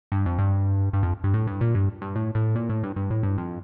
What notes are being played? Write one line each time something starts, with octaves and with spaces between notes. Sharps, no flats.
G2
F2
G2
G2
F2
G2
A2
G2
A#2
G2
G2
A2
A2
A#2
A2
G2
G2
A2
G2
F2